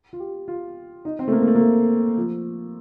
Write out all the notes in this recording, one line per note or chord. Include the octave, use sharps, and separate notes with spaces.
F4
G4
F4
D#4
C4
A3
A#3
A#3
A3
A#3
A3
F3